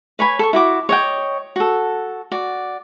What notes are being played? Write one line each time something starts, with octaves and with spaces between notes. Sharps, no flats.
B4 C#5 G#5 B5
A4 C#6
E4 F#4 D6
C#5 D#5 G5
F#4 A4
F#4 D5